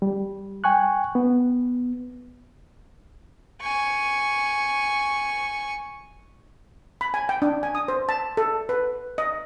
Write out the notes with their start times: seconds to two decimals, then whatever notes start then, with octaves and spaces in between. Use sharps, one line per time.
0.02 G3
0.64 G5 G#5 C#6 F#6
1.15 B3
3.62 G#5 C#6
7.01 B5
7.14 G#5
7.29 G5
7.42 D4
7.63 G#5
7.75 D#6
7.88 C5
8.09 A5
8.37 A4
8.69 B4
9.18 D#5